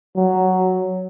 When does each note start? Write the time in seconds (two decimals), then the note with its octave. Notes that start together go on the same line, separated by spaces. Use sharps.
0.16 F#3